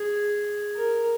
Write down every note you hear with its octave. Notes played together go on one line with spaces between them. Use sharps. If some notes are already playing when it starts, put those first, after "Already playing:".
Already playing: G#4
A#4